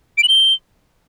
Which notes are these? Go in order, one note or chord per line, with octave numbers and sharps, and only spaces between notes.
D7
F#7
G7